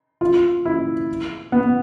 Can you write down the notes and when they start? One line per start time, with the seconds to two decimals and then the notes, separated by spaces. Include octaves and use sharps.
0.21 F4
0.65 E4
1.52 B3